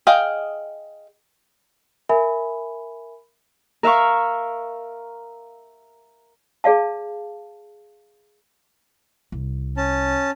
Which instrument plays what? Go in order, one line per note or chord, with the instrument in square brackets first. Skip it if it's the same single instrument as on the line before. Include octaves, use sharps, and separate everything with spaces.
[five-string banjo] G#4 D#5 F5 G5
[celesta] A#4 E5 G#5 B5
[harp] A#4 E5 F5 C#6
[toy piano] G#4 D5 F5 A5
[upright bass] C2
[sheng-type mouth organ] C#4 A5